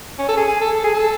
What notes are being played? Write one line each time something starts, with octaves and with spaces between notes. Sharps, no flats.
C#4
A4
G#4
G#4
A4
A4
G#4
A4